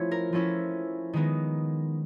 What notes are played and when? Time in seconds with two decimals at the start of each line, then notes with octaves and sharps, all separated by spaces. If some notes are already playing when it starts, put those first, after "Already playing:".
Already playing: F3 A3 C#4 E4 C#5
0.11 A#4
0.33 F3 A3 C#4 E4
1.13 D#3 G#3 B3 D#4